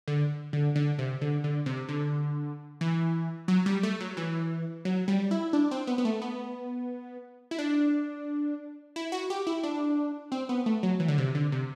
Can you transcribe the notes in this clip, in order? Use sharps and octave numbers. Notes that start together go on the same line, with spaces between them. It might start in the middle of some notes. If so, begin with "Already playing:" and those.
D3
D3
D3
C3
D3
D3
C3
D3
E3
F#3
G3
A3
F#3
E3
F#3
G3
E4
D4
C4
B3
B3
A3
B3
E4
D4
E4
F#4
G4
E4
D4
C4
B3
A3
F#3
E3
D3
C3
D3
C3